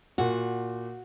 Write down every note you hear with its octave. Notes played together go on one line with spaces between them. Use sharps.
A#2 F#4 F#5